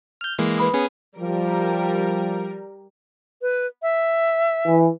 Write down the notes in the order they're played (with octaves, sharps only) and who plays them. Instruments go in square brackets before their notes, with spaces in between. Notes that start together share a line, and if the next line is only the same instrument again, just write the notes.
[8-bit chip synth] F6 G6
E3 G#3 A#3
[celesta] B4 B5 D#6
[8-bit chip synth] B3 C#4 G#4
[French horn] F3 [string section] G3 A#4
[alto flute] B4
E5
[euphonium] E3